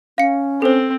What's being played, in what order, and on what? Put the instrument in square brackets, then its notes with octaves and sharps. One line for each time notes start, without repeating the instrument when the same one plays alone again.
[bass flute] C#4 [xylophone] F5 C#7
[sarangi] C4 [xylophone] A4 C5